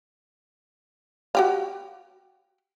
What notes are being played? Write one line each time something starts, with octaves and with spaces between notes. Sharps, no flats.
F#4 G4 F5